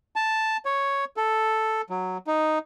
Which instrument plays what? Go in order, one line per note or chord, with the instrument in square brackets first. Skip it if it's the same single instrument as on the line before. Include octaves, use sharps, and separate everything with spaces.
[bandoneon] A5
C#5
A4
F#3
D#4